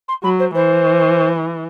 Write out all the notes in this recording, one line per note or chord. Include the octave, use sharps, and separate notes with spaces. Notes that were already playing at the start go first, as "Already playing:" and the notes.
C6
F#3 B5
C5
E3 C5